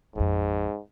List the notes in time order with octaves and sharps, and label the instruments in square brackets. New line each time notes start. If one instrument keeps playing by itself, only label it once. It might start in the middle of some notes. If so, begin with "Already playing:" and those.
[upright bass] A1 F2 [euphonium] G#2